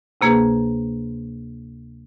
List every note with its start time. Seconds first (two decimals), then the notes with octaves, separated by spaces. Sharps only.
0.21 D2 C3 A#3 G#4 B4